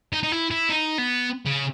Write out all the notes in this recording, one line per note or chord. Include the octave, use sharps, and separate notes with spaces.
D#4
D#4
E4
E4
D#4
B3
C#3